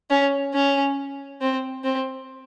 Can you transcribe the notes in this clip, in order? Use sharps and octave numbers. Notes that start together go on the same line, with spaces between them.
C#4
C#4
C4
C4